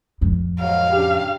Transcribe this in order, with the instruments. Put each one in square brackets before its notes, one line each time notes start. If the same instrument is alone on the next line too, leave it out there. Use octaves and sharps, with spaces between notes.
[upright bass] F2 A2
[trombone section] G#2 D#3 F#3 [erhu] F5
[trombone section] C#3 D4 G4